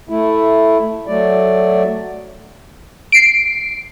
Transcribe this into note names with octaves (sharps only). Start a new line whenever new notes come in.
A3 E4
F#3 A3 D5
C7 D7